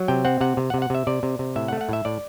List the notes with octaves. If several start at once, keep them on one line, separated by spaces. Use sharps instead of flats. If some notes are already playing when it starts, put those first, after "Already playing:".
Already playing: F#3
C3 G5
C4 F#5
C3 F#5
C3
F#5
C3
F#5
C3 E5
C3 D5
C3
C3
A2 E5
F#5
A3
F#5
A2 E5
A2 D5